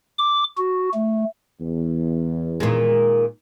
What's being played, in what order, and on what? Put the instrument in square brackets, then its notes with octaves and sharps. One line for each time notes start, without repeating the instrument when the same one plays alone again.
[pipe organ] D6
F#4
A3
[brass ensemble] E2
[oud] A#2 D#3 G#3